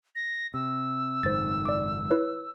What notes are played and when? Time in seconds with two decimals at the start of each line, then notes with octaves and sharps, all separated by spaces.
0.15 A#6
0.54 C3 E6
1.23 F#1 G#2 D#3 C5 A6
1.65 D5 D6
2.10 E4 B4 C#5